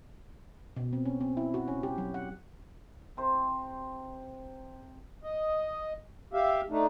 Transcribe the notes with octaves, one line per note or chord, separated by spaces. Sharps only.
B2
C4
C#4
C4
E4
F#4
C#4
G4
F#3
F#5
C3 C5
D#5
G4 E5 F5
A3 D4 D#4